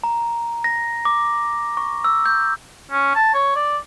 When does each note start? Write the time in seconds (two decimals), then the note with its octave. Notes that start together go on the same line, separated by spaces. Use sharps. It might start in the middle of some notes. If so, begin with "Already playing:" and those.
0.04 A#5
0.64 A#6
1.05 D6
1.77 C#6
2.04 E6
2.26 G6
2.91 C#4
3.15 A5
3.34 C#5
3.55 D5